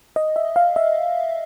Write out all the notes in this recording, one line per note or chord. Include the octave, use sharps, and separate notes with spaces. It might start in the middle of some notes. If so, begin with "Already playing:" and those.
D#5
E5
F5
E5